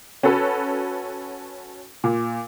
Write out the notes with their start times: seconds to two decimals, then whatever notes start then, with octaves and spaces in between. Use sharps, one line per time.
0.23 C#4 F#4 A4 B4
2.04 A#2